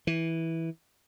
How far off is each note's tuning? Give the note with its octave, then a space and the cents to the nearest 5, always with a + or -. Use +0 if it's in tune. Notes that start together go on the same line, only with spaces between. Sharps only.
E3 -10